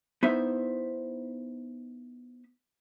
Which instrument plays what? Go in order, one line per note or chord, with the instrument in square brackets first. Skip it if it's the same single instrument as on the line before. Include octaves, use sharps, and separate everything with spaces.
[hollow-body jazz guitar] B3 D#4 E4 C5 E5